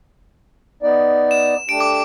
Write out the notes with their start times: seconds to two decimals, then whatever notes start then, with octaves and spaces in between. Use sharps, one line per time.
0.83 B3 D#4 D5
1.31 E7
1.69 A3 D4 G4 D7
1.80 D6